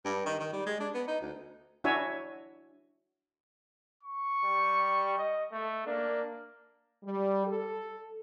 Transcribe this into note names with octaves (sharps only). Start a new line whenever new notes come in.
G2
D#3
D#3
G3
G#3
D4
B3
D#4
D2
D4 E4 F#4 C#5 E5 G#5
C#6
G3
D#5
A3
A#3 D4
G3
A4